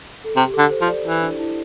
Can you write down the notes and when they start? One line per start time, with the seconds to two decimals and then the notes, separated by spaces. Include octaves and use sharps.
0.24 A4
0.36 C3 G4
0.54 D3 A4
0.70 C5
0.81 F3
0.88 D5
1.05 E3 E4
1.22 D4
1.39 E4